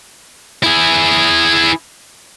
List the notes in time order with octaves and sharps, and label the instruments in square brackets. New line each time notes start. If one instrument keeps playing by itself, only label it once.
[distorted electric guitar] E4 G#4